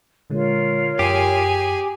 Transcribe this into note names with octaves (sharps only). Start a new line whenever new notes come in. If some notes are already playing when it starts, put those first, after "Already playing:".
A#2 D3 G#3 F4 A#4 C#5
F#2 G4 G#4 G#5